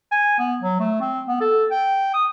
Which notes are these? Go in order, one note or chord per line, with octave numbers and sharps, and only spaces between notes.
G#5
B3
F#3
A3
C4
B3
A4
G5
D#6